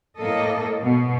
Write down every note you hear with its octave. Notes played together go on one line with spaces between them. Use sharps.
A2 A#3 A4 D#5
B2